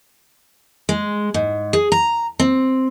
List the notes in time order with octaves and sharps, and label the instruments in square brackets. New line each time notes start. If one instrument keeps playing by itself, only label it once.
[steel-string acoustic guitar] G#3
G#2
G#4
A#5
C4